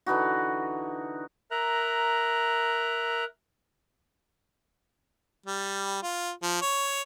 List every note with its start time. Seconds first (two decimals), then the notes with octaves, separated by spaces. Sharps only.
0.06 D3 E3 D#4 F#4
1.51 A#4 E5 A#5 F#6
5.46 G3
6.03 F4
6.42 F3
6.61 C#5